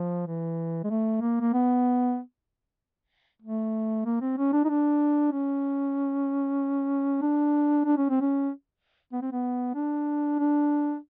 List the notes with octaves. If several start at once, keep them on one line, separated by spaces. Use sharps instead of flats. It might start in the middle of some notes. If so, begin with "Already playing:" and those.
Already playing: F3
E3
G#3
A3
A#3
A#3
B3
A3
A#3
C4
C#4
D4
D#4
D4
C#4
D4
D4
C#4
C4
C#4
B3
C4
B3
D4
D4